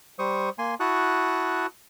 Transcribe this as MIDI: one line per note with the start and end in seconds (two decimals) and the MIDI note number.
0.19 0.50 55
0.19 0.50 72
0.19 0.50 85
0.19 0.50 87
0.59 0.75 58
0.59 0.75 80
0.59 0.75 84
0.80 1.66 64
0.80 1.66 66
0.80 1.66 81
0.80 1.66 85
0.80 1.66 87
0.80 1.66 90